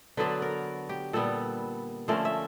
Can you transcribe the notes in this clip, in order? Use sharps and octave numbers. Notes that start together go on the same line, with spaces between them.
D3 F#3 B3 D4 B4
A#4
G4
A#2 G3 B3 A4
D3 F3 A3 C#4 A#4
E5